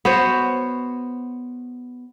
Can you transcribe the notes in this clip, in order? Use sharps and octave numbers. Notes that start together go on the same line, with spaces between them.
B3 F#4 C5 C#5